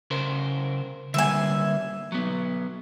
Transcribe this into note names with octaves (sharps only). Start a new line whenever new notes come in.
C#3 A#4 C5
D3 G3 A#3 E5 G#5
F#3 B3